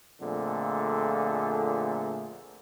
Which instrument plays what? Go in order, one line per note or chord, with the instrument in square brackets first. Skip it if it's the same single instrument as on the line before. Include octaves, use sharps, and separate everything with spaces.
[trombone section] F2 A#2 D3 A3 G#4